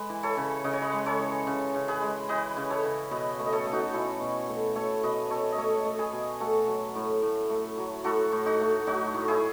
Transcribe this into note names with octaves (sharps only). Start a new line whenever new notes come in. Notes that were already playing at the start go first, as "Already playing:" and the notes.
Already playing: G#3 B4
E3
A4 C#5
C#3
C#3 D#5
C#5
B4 D#5
G#3
A4 C#5
E3
C#3
C#3
G#4 B4
G#3
E3 B4 D#5
C#3
A4 C#5
C#3
B2 B4 D#5
A3
D#5
A4 C#5
A3
D#4 F#4
B2 C#4 E4
B2
A3
A3 A4 C#5
B2 B4 D#5
B2 A4 C#5
D#5
A3 A4 C#5
A3
G#4 B4
B2
A3 F#4 A4
F#3
A2
A2
A3
F#3
A2 F#4 A4
A2
D#4 F#4
A3
F#3 D#4 F#4
A2
E4 G#4